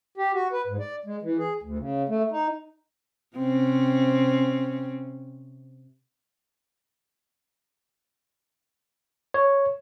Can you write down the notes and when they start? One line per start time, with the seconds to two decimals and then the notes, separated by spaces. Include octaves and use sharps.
0.18 G4
0.33 F#4
0.52 B4
0.67 G#2
0.80 D5
1.06 G#3
1.22 E3
1.38 G#4
1.63 D2
1.78 C#3
2.08 A3
2.31 D#4
3.37 C3 C4 C#4
9.34 C#5